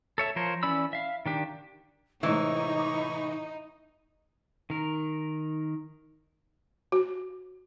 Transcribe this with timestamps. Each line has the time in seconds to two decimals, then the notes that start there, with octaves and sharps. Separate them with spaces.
0.18 A4 C#5 E5
0.36 F3 A#4 C5 C#5
0.63 E3 C#4 D5 B5 E6
0.93 E5 F5
1.26 D#3 D4 G4
2.23 A2 C3 E3 G#3 D#4 C#6
4.70 D#3 A#4
6.92 F#4